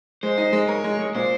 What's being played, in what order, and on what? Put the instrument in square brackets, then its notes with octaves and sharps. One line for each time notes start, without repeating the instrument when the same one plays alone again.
[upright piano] G#3 [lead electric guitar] C5
[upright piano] D#4
G#3
[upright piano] A#4 [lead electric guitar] C#5
[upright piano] G#3
G#3
[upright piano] A#2 [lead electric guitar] C5